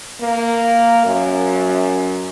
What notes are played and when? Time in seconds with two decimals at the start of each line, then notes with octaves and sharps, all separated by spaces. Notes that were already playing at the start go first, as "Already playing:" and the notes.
0.21 A#3
1.06 F#2